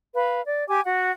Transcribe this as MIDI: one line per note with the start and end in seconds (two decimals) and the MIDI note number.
0.15 0.40 71
0.15 0.40 77
0.45 0.66 74
0.68 0.81 67
0.68 0.81 80
0.68 0.81 86
0.85 1.11 66
0.85 1.11 78